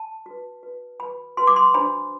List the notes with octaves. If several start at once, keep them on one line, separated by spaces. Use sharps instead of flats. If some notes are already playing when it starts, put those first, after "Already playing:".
Already playing: A5
F#4 B4
F#4 B4
F#4 B4 B5
F#4 B4 C6
D6
C6
D4 F#4 C5 B5